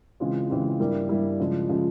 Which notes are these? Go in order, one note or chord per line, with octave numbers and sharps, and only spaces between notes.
C#3 E3 G#3 C4 F4
C#3 E3 G#3 C4 F4
G2 G3 A#3 E4
G2 G3 A#3 E4
C#3 F3 G#3
C#3 F3 G#3